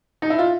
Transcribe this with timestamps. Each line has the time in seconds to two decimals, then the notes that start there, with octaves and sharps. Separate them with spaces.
0.22 D#4
0.30 E4
0.38 F4